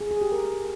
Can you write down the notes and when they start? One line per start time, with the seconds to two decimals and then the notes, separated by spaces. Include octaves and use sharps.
0.01 G#4
0.11 G#4
0.21 G4
0.32 A#4